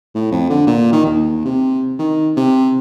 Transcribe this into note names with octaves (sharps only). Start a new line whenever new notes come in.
A2
F2
D3
A#2
D#3
D#2
C3
D#3
C3